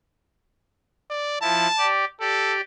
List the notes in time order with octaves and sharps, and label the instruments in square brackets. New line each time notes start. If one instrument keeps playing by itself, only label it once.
[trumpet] D5
[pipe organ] F3 E4 [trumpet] A5
[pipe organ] G4 D5
[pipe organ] G4 D5 [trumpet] A4